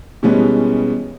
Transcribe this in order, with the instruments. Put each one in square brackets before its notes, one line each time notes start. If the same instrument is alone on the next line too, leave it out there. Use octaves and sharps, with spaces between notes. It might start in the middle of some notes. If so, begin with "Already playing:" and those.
[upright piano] B2 E3 G3 G#3 B3 C#4